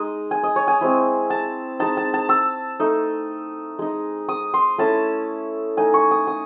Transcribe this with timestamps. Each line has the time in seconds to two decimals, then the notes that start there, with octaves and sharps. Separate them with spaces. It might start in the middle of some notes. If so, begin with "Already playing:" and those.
Already playing: G#3 D#4 D#6
0.31 G#5
0.43 D#5
0.56 C#5
0.68 G#5
0.81 G#3 C4 E4
1.30 A5
1.80 G#3 D#4 A5
1.97 A5
2.14 A5
2.29 E6
2.80 A3 D#4
3.79 G#3 D#4
4.29 D#6
4.54 C6
4.78 A3 C#4 E4 A5
5.77 A3 D#4 G#5
5.94 C#6
6.11 D#6
6.27 D#6